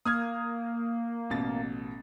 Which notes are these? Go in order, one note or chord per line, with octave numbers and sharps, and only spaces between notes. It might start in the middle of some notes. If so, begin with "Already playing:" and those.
A#3 D#6 F6 G#6
A1 B2 A6